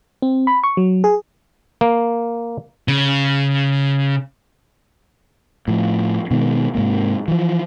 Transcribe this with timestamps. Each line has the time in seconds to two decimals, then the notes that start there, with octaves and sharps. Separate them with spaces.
0.22 C4
0.47 B5
0.64 C#6
0.77 F#3
1.04 G#4
1.81 A#3
2.88 C#3
5.68 A2 F3
6.31 B2 D#3 G#3
6.75 G#2 C3 A#3
7.28 E3 F3